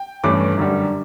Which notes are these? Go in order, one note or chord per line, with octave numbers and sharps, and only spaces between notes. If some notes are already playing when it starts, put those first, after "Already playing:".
Already playing: G5
G2 E3 A3 C#4 D6
F#2 D3 G3